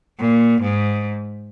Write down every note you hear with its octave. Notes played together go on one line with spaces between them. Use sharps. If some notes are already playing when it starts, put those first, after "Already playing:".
A#2
G#2